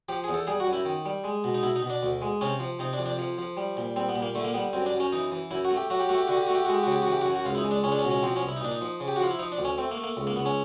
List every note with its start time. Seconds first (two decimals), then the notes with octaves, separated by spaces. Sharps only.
0.09 F3 G4
0.24 E2 G#4
0.34 A4
0.47 G3 G#4
0.60 F#4
0.67 F#2
0.73 E4
0.85 D#3
1.05 G3
1.24 G#3
1.44 B2
1.54 D#4
1.63 B2 E4
1.76 D#4
1.83 B2
1.90 D4
2.03 D2
2.22 G#3
2.41 C3 C#4
2.60 F3
2.79 C3 D#4
2.93 D4
2.99 F2
3.06 D4
3.18 F3
3.38 F3
3.57 G3
3.77 A#2
3.96 G3 C4
4.09 B3
4.16 A#2
4.22 A#3
4.35 D3 A3
4.44 A#3
4.54 G3 B3
4.73 F#2 C4
4.86 D4
4.94 F#2
5.00 C#4
5.12 E3 D#4
5.32 E3
5.51 F#2 E4
5.65 F#4
5.71 A3
5.77 G4
5.90 F#3 F#4
6.00 G4
6.09 A3 F#4
6.18 G4
6.27 D3 F#4
6.37 G4
6.47 A3 F#4
6.55 G4
6.65 G#3 F#4
6.74 G4
6.83 C#3 F#4
6.92 G4
7.02 F#4
7.07 E3
7.12 G4
7.21 F#4
7.25 F#2
7.35 F#4
7.45 C#2 F4
7.55 E4
7.58 D#4
7.64 G#3
7.71 D4
7.83 C#2 C#4
7.92 D4
7.99 C#4
8.04 B2
8.11 C#4
8.23 F3 C4
8.36 C#4
8.43 C2
8.48 E4
8.56 D#4
8.61 A#2 D4
8.72 D#4
8.82 F3
9.00 C#3
9.08 G4
9.16 F#4
9.20 F3 F4
9.31 E4
9.39 F3 D#4
9.52 D4
9.58 D2
9.65 C#4
9.78 A3 C4
9.91 A#3
9.97 A3
10.04 A#3
10.17 C#2
10.27 A#3
10.36 C#2 B3
10.46 C#4